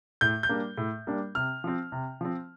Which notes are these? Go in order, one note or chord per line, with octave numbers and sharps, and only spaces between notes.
A2 G6
G6
G3 A#3 D4
A2
G3 A#3 D4
C3 F6
F3 C4
C3
F3 C4